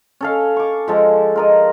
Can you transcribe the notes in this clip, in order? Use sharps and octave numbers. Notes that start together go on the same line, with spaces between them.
C#4 A4 F5
C#6 D6
F3 G#3 A4
F4 A#4 D#5